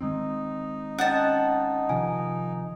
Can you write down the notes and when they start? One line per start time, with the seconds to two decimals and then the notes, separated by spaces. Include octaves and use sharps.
0.01 D#3 G#3 C4 D#4
0.99 C#4 D#5 F#5 A5
1.89 C3 D#3 F3 G#5